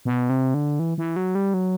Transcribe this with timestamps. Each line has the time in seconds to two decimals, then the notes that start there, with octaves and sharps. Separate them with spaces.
0.05 B2
0.30 C3
0.54 D3
0.79 E3
0.98 E3
1.16 F#3
1.35 G3
1.54 F#3